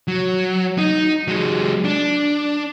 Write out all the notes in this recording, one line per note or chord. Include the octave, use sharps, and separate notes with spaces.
F#3
D#4
F#3 G#3
D4